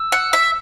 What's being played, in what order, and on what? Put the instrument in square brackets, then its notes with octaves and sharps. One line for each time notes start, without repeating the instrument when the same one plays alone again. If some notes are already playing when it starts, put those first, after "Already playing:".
Already playing: [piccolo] E6
[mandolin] F#5
E5